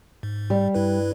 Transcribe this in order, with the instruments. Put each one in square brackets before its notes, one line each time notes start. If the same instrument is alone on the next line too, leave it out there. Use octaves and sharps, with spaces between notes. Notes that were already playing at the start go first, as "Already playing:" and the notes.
[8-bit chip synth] G#2
[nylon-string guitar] G3
[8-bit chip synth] G2 E4 B4